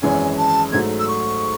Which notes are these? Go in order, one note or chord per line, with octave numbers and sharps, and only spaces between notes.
G#1 F#2 E3 G#3 C#4 G#5
A5
G#2 F#3 A3 G#6
E6
C#6